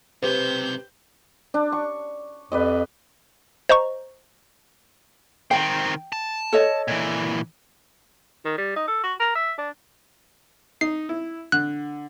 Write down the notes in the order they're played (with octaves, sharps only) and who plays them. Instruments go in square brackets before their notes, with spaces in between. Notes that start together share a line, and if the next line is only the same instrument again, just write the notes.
[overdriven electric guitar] B1 C3 [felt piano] G4 B4 C5 [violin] G6
[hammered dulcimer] D4
C#6
[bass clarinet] F2 [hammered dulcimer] B4 D5 D#5
[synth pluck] C5 D#5 A#5 C#6
[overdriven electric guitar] D#3 C4 [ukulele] G5
[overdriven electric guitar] A5
[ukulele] A4 C#5 D#5
[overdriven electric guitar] A#2 E3
[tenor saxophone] D#3
G3
D#4
A4
F#4
A#4
E5
D4
[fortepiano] D#4 [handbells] C7
[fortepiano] E4
[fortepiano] D3 [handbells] F#6